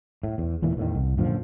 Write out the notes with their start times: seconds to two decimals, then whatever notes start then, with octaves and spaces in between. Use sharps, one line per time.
0.23 A2
0.38 E2
0.62 E1 E2 A#2 E3
0.77 E2 A2 D#3
0.95 C2
1.18 F#2 A#2 D3 F3